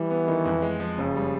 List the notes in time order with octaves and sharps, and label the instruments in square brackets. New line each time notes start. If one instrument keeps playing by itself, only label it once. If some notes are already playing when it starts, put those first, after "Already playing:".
Already playing: [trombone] E3 [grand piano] G3
[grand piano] B3
D#3
F2
G#3
F3
[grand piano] F#1 [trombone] C#3
[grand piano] G3